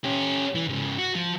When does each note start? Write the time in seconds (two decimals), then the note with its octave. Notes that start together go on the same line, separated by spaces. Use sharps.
0.05 C#4 G4
0.55 E3
0.68 G#2 C#3
0.98 F#4
1.15 F3